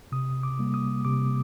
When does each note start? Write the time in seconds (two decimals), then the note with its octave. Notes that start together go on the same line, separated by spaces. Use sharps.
0.12 C3 D#6
0.43 D6
0.59 G3 A#3
0.74 D#6
1.05 C3 D6